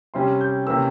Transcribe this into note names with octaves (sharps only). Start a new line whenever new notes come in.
C3 G3 C#4 C6
G6
C3 E3 A#3 C#4 E6